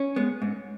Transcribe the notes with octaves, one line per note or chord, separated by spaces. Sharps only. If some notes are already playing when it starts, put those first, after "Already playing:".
Already playing: C#4
G#3 B3
G#2